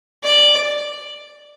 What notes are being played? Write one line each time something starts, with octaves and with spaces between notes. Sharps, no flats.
D5